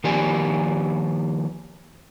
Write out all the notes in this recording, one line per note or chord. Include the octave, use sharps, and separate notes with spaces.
D#3 F3 A#3 G4 D5 G#5